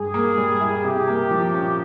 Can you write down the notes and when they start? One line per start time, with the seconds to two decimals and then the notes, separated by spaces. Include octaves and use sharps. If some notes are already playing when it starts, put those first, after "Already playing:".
Already playing: G2 G#4
0.14 A#3
0.37 G3
0.61 E4
0.84 C3 G4
1.08 A#3
1.31 F3
1.54 C#4